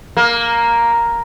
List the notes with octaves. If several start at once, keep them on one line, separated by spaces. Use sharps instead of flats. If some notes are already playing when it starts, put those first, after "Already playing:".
A#3